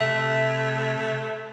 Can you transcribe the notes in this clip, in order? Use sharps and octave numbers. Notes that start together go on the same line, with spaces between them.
C3 A3 E5